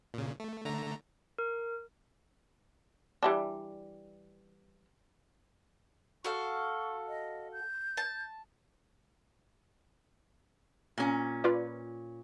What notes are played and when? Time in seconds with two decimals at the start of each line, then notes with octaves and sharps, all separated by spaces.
0.14 A#2 C#3
0.40 A3
0.65 D3 A3 A#5
1.38 A#4
3.23 E3 G3 D4
6.24 F#4 A4 F5 C#6
7.08 D#5
7.53 G6
7.97 A5
10.98 A#2 C#4
11.44 F4 B4 D5